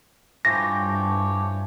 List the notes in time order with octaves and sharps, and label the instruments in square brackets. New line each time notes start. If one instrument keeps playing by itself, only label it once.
[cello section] G2 [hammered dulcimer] E3 F3 G5 [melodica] A3 G4 C#5 [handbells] A#6